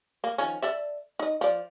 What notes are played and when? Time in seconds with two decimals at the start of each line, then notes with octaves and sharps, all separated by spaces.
0.24 A#3
0.38 D#3 F3 C#4
0.62 A4 D5 E5
1.19 D#4 D#5
1.41 F3 D5